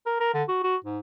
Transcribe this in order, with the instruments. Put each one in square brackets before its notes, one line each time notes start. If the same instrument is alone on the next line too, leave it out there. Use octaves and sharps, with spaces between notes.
[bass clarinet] A#4
A#4
D3
F#4
F#4
G#2